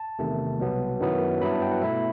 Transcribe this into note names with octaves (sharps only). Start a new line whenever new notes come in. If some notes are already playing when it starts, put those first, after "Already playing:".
Already playing: A5
E2 C3 D#3 A3
C2 B2 F#3 B3
F#2 D#3 F#3 B3 E4
G2 F#3 B3 E4 B5
A5
G5
F#5
B2 A3 E4 E5